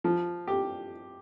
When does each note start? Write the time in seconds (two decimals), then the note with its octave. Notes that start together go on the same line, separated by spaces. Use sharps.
0.04 F3
0.47 G4